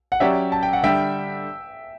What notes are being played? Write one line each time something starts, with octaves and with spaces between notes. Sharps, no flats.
F#5
F#3 C#4 G4 D5 E5 G5
A5
G5
F#5
D3 G3 E5 G5